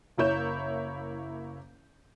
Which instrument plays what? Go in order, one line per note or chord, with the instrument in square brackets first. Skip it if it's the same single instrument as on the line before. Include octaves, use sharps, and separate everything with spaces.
[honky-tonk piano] F#1 A#3 E4 C#5 G6 E7